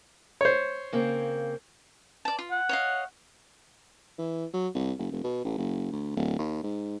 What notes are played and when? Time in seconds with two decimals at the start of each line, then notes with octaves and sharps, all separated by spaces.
0.41 C5 C#5
0.93 C#3 A#3 C4
2.25 D5 A5
2.39 F4
2.51 F#5
2.69 C#5 D#5 F5
4.18 E3
4.53 F#3
4.75 C2
4.98 F#1
5.12 F1
5.24 B2
5.45 A1
5.58 F#1
5.92 D2
6.16 D1
6.39 D#2
6.64 G#2